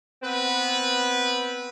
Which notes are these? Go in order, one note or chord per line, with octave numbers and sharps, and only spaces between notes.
B3 C4 B4